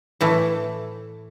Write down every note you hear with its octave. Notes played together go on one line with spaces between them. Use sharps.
A2 E3 A3